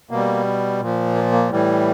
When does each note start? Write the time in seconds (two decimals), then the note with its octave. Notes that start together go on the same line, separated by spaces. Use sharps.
0.11 B2 G3 A#3
0.80 A#2 F3
1.15 A#3
1.32 A#3
1.50 A2 E3 G3